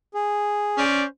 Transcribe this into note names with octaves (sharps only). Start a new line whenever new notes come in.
G#4
C#4 C5 D5